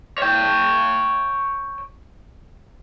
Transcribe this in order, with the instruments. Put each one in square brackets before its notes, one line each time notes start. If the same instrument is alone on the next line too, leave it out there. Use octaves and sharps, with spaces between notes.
[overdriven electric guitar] C#5 G5